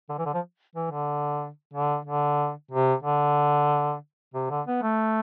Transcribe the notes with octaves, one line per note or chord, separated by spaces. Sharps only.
D3
E3
D3
F3
E3
D3
D3
D3
C3
D3
C3
D3
B3
A3